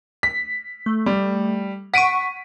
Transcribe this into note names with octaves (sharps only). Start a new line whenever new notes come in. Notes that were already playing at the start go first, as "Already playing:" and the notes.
B6
A3
G3
F#5 C#6 B6 D7 D#7